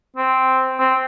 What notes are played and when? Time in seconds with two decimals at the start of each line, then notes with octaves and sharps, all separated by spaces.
0.17 C4
0.79 C4